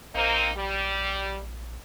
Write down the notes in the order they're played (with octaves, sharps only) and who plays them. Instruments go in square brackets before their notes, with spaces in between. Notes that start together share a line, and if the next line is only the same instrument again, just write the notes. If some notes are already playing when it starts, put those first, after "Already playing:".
[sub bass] A#1 [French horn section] A#3 C4 D#4
[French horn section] G3